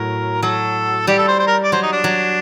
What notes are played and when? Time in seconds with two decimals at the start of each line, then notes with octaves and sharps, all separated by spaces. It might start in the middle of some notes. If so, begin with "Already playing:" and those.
Already playing: A2 F#3 A#4
0.43 F#3 A4
1.07 G3 G4
1.19 A4
1.28 C5
1.40 C5
1.47 A#4
1.64 D5
1.72 F#3 C5
1.83 D#4
1.93 D4
2.04 F#3